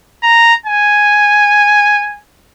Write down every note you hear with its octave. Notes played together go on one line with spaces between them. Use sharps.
A#5
G#5